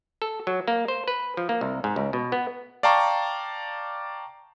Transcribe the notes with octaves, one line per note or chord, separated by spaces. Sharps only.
A4
F#3
A#3
C5
B4
F3
A#3
C2
G#2
C#2
B2
B3
D5 F5 G5 A5 A#5 C#6